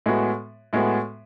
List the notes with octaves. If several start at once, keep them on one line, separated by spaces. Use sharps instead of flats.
A2 G#3 B3 F#4
A2 G#3 B3 F#4